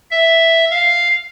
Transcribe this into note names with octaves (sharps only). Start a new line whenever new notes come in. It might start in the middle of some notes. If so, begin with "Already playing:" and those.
E5
F5